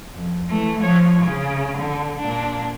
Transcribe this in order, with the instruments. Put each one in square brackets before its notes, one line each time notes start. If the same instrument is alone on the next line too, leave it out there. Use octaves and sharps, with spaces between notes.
[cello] F2
E3 A3
F3 C#5
C#3
D3
A#2 D4